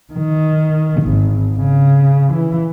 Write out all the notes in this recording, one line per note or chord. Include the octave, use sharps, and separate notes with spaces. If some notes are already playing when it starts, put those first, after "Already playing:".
D#3
G#1
C#3
E3